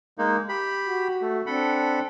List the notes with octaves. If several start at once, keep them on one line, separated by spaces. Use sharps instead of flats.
G#3 A#3 D#4
G4 B5
F#4
A3
C4 D4 A4 F#5 B5